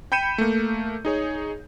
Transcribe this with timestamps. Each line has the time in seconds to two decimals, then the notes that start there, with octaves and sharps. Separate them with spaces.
0.12 G5 B5 G6 C#7 D#7 E7
0.38 A3 A#3
1.05 D#4 G#4 C#5